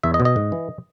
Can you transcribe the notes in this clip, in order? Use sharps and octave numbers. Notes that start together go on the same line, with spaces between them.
E2 E5
D#5
B2
D#5
G#2
E3